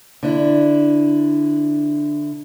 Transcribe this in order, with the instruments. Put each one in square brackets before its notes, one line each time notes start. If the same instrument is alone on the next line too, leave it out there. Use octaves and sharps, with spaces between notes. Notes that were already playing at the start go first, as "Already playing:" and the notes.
[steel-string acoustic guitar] D3 D4 E4